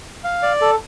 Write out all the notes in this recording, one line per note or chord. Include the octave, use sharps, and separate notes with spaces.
F5
D5
A4